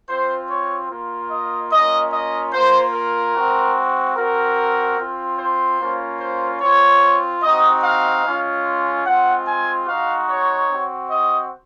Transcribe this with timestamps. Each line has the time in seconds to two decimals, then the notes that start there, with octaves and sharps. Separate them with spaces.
0.09 C4 F4 C5
0.50 C#5
0.90 A#3 F4
1.31 D#5
1.72 A#3 C#4 F4 D#5
2.13 D#5
2.53 A#3 F4 C5
2.94 A#4
3.35 G#3 C4 F#4
4.17 C4 F#4 A#4
4.98 C4 F4
5.39 C5
5.80 A#3 C#4 F4
6.20 C5
6.61 C4 F4 C#5
7.43 C4 D#4 F#4 D#5
7.84 F5
8.25 G#3 C#4 F4
9.06 G#3 C4 F4 F#5
9.47 G#5
9.88 G#3 D#4 F#4 F5
10.29 C#5
10.70 C4 F#4
11.10 D#5